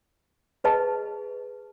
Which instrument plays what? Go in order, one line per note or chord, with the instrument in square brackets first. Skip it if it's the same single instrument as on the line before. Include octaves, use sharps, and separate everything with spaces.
[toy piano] G#4 B4 D#5 A5